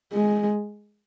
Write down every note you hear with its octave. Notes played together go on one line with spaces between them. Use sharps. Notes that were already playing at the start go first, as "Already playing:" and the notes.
G#3